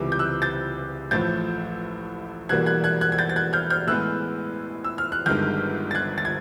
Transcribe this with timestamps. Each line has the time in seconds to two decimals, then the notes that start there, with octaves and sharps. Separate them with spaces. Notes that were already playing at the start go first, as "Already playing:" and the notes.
Already playing: C#2 C3 E3 G3 D6
0.12 G6
0.19 E6 F#6
0.42 G6 A6
1.11 A1 A2 F3 A3 G6 A6
2.49 E1 E2 B2 G3 A#3 F#6 G#6
2.66 F#6 G#6
2.84 F#6 G#6
3.01 F#6 G#6
3.12 G#6
3.18 G6 A6
3.29 A6
3.36 F#6 G#6
3.53 F6 G6
3.70 F6 G6
3.87 A2 E3 G#3 B3 E6 F#6
4.84 E6
4.98 F6
5.12 F#6
5.26 G1 G2 D#3 G#3 F6 G6
5.91 A6
5.95 F#6 G#6
6.18 A6
6.25 G#6